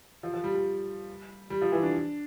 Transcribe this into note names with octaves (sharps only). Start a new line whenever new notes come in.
F3
F3
G3
G3
G3
F3
E3
D4